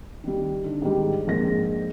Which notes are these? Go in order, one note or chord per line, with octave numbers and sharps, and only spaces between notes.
D#3 G3
D3 D#4
G#2 D#3 G3
A#1 F2 G#2 A#3 A#6